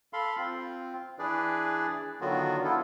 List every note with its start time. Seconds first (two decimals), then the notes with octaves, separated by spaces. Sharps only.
0.13 A4 F5 B5 C6
0.38 C4 F4
1.19 E3 D4 G#4 B4 D5
2.21 D3 D#3 F#3 B3 F4 F#4
2.64 B3 E4 F4 A4